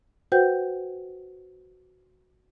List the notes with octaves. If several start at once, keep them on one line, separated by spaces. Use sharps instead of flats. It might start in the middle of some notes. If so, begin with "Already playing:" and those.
F#4 B4 C5 F#5 G5 G6